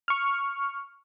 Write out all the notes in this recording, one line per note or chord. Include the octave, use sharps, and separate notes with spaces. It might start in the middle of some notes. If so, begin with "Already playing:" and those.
C#6 F6